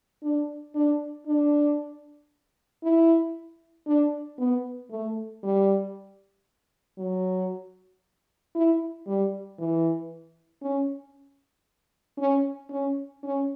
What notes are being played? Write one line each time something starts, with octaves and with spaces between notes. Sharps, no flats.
D4
D4
D4
E4
D4
B3
A3
G3
F#3
E4
G3
E3
C#4
C#4
C#4
C#4